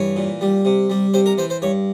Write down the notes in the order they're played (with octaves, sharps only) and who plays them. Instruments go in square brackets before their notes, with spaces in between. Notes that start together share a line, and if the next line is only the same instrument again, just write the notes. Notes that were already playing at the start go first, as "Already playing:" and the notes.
Already playing: [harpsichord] G2 E3 C#5
A#2
G3
C3
G3
C3 C5
A#4
E3 C5
C5
G2 C#5